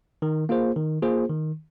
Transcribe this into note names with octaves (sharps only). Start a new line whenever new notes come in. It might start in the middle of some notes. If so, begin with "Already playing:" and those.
D#3
A#3 F4 G#4 C5
D#3
A#3 F4 G#4 C5
D#3